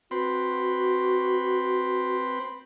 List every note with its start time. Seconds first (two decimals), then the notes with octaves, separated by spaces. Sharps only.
0.11 C4 F#4 B4 C6